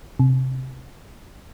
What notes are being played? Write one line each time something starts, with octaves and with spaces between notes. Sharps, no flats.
C3